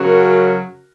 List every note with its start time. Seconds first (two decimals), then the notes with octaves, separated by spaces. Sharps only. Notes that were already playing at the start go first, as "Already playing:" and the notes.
Already playing: F#2 C#3 F#3 F#4 A#4